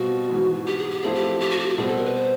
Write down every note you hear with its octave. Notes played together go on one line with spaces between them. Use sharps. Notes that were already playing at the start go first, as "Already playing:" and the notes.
Already playing: B2 G3 C4 F4 F#4
G#2 E3 G#3
G4
G#4
G4
F3 A3 C4 E4 G#4
G4
G4
F#4
G4
F#4
B2 G3 C4 G#4
A4
A#4
B4
C5